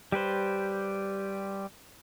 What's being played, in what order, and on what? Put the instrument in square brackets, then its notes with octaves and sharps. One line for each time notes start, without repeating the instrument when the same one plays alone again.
[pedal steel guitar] G3 G4 B4 C5